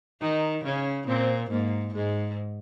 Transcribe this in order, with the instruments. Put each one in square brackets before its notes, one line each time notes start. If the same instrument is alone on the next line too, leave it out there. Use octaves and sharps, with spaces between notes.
[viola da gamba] D#3 [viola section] D#4
[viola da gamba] C#3 [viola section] C#4
[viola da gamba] A#2 [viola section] C4
[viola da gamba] G#2 [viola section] A#3
[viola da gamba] G#2 [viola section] G#3